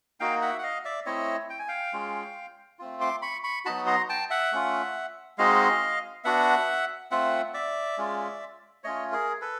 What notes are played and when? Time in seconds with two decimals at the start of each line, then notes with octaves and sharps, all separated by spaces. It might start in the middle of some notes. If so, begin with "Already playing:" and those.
0.20 A#3 D#4 F#4 F5 G5
0.41 E5 F#5
0.59 F#5
0.63 D#5 F5
0.85 D5 E5
1.06 A3 C4 E4 C#5 D#5
1.50 G5
1.59 G#5
1.68 F5 G5
1.93 G#3 C#4 F4
2.79 A3 C4 F4
3.01 C6 D6
3.22 B5 C#6
3.44 B5 C#6
3.65 F#3 B3 D#4 F#4 A5 B5
3.87 A#5 C6
4.09 G5 A5
4.30 E5 F#5
4.52 A3 C#4 F4
5.38 G#3 C4 D#4 F#4 D#5 F5
6.24 B3 D4 F#4 E5 F#5
7.11 A3 C4 F4 E5 F#5
7.54 D5 E5
7.98 G#3 C#4 F4
8.84 A3 C#4 F4 C#5 D#5
9.12 G#4 A#4
9.42 A4 B4